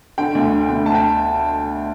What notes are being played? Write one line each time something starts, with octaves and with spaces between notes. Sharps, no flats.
D3 G5
D2
D3
D2
D2 A5
G5